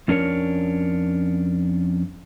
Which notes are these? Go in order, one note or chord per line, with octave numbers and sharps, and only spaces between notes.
F2 C#4 D4 A#4 C#5